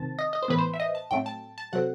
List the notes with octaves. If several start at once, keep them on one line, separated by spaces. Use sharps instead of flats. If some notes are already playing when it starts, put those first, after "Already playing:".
Already playing: C3 D#3 C4 A5
D#5
D#5
C5
A2 E3 B3 B4
C5
E5
D#5
A5
A2 F#3 A3 C4 G5
A5
A5
C3 F#3 A3 C4 F#5